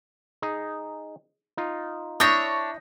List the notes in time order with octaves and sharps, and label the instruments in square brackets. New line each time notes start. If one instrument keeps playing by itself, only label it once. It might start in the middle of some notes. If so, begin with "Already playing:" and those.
[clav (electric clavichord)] D#4 G#4
D#4 F4
[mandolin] D4 C#5 [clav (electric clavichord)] E4 [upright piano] D#6 G6 A#6